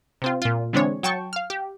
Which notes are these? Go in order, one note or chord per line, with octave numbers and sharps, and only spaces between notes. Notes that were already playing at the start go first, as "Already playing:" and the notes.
C3 C4 F4
A#2 F4
D3 E3 G#3 C4 D4 C#5
F#3 G5 A5 C#6
F5 F6
G4